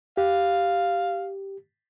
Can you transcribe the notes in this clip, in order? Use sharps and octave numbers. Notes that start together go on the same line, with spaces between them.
G4 F5